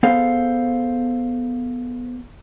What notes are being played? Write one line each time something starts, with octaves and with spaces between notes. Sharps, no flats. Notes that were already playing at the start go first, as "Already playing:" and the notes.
B3 G#4 A4 C5 F5